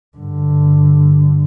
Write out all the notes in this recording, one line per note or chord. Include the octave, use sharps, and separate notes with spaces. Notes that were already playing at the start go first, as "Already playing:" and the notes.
G2 D3